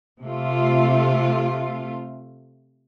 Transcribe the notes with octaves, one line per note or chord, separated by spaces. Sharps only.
C3 A3 F4